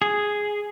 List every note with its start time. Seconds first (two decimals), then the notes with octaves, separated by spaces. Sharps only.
0.02 G#4